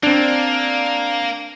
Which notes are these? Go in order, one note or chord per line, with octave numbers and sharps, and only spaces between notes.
A#3 C4 D4